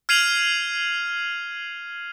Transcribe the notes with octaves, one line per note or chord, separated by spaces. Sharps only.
F6 G#6 C7 D#7 F7 F#7